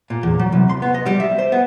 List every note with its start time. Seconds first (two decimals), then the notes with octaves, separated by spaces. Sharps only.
0.10 A#2
0.23 E2
0.39 F#3
0.52 C2
0.69 C6
0.82 B3
0.94 D#5
1.06 G3
1.20 E5
1.39 C5
1.52 B3